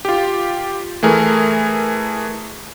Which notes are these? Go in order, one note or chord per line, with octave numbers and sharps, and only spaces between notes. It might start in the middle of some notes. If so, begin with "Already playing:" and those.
F4 G4
E3 A3 G#4 A#4